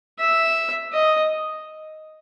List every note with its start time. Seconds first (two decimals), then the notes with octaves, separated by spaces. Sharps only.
0.19 E5
0.93 D#5